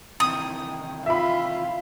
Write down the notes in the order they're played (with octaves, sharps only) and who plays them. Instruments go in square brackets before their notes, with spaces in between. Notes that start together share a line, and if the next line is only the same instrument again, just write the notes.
[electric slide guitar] C3 D#3 E3 [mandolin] D#6
[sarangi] F4 [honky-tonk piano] E5 B5